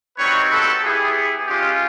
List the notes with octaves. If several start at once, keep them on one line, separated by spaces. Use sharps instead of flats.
G3 C4 D#4 F#4 B4 C#5
A4 B4
B3 E4 G4 G#4
G#3 C#4 F4 G4